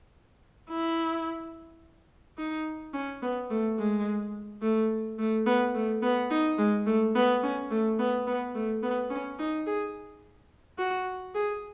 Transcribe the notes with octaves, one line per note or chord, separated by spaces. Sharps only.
E4
D#4
C#4
B3
A3
G#3
A3
A3
B3
A3
B3
D#4
G#3
A3
B3
C#4
A3
B3
B3
A3
B3
C#4
D#4
G#4
F#4
G#4